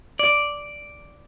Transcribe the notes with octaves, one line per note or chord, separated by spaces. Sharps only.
D5